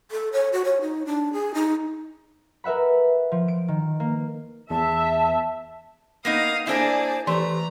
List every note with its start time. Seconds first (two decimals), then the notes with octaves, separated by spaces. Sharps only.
0.11 A4
0.33 C#5
0.52 F#4
0.65 C#5
0.81 D#4
1.06 D4
1.33 G#4
1.54 D#4
2.64 A#4 B4 E5 F#5 B5
3.32 F3
3.48 D7
3.68 D#3
4.00 A#3
4.70 E2 E5 A5
6.25 A#3 B3 D#4 F5 D#6
6.67 A#3 D4 E4 G#4 C5 D5
7.27 E3 A3 G4 B4 A#5 C6